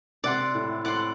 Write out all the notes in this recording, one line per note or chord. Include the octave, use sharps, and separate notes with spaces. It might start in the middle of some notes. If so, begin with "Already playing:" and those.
C3 D5 F#5 C6
A2
A2 D5 F#5 C6